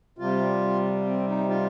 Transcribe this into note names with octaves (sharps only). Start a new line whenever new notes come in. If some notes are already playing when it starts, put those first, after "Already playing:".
C3 G3 F4
C4
D#4
F4